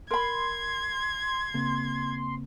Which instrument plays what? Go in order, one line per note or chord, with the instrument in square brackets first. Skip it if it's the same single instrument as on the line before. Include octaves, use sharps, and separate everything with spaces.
[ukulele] A#4 B5 [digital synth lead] C6 [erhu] G#6
[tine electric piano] C#3 A#3 C4